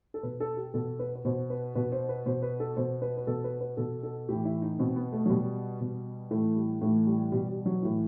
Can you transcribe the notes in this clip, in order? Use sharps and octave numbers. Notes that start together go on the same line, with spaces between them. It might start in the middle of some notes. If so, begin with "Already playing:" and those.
A4
B2 B4
A4
G4
B2 A4
B4
B4
B2 C5
B4
B2 B4
C5
B4
B2 C5
B4
A4
B2 C5
B4
B4
B2 A4
B4
B4
B2 A4
A4
A2 E3 G4
E4
D#4
B2 C4
B3
A3
F#3
B2 G3
B2
A2 E3 A3
G3
A2 E3 A3
G3
B2 G3
G3
F#3
A2 E3